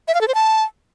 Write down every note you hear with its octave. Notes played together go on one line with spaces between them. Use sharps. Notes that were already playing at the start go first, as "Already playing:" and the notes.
E5
F5
A4
C5
A5